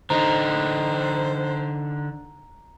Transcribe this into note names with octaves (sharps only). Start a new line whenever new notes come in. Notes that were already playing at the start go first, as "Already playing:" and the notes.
D3 D#4 C5 A#5